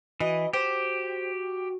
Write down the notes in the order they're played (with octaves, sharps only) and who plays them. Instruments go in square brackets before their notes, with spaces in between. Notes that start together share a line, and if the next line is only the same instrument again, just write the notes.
[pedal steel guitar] E3 [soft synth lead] F#4 [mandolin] D#5
[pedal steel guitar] G4 [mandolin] C5